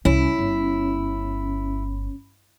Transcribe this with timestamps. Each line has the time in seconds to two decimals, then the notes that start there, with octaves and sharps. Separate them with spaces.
0.05 C2 C#4 E4
0.39 G1